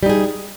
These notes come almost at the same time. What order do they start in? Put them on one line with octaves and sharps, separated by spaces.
G3 D#4 G#4